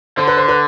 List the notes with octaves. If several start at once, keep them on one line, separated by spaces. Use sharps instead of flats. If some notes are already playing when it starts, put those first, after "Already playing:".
D3 C5
B4
C5
B4